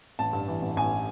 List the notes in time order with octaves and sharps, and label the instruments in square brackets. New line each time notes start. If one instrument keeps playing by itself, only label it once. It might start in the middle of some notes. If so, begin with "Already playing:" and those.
[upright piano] A1 A5
G2
E3
A1
A1 G#5